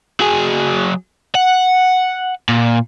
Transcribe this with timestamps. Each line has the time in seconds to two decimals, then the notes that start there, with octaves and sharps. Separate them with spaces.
0.20 F#3 G#4
1.35 F#5
2.49 A#2